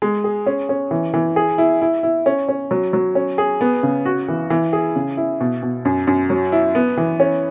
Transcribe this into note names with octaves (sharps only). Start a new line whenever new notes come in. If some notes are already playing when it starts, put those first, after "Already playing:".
G#3
G#4
C#4
C#4
E3
E3
G#4
E4
E4
E4
C#4
C#4
F#3
F#3
C#4
G#4
B3
C#3
F#4
E3
E3
G#4
C#3
E4
B2
B2
F#2
F#2
F#3
E4
B3
E3
C#4